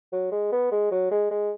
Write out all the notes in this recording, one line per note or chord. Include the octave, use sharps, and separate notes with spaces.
F#3
G#3
B3
G#3
F#3
G#3
G#3